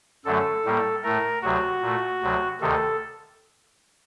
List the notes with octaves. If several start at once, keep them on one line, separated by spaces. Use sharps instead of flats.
F#2 D3 F#3 A3 A4
A2 G3 A#3
A2 A3 A#4
D2 C3 F#3 F#4
A#2 A3
D2 C3 F#3
D2 C3 D#3 A4